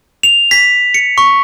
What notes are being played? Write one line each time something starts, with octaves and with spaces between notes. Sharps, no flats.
F7
B6
C#7
C#6